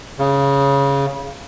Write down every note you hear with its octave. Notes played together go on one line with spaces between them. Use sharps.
C#3